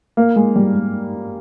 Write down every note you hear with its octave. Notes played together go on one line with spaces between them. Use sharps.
A#3
G#3
G3
G#3